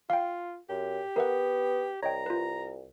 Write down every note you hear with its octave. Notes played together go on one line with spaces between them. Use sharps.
F4 F5 G5
F#2 G4
B3 A#4 E5 F#5
C2 C#5 D#5 G5 A#5
F4 B4